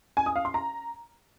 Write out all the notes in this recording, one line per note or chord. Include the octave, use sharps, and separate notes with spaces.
G#5
D#6
F5
C6
A#5